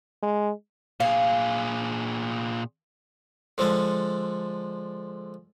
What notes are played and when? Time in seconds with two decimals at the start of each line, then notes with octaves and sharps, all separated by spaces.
0.23 G#3
1.00 A#2 G#4 F5
3.58 D3 F3 G#3 A4